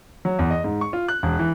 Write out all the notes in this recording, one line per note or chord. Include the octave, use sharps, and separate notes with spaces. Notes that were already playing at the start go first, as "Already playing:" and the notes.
F#3
E2
D#5
G#2
C#6
F4
F#6
E1
E3